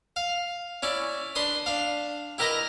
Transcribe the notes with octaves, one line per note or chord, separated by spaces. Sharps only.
F5
C#4 E4 D5
D4 B4 C6 D#6
D4 F5
E4 G4 A#4 B4 D#5 A#5